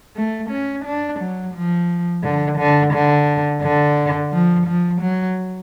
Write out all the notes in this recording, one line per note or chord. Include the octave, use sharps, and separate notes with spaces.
A3
C#4
D4
F#3
F3
D3
D3
D3
D3
F3
F3
F#3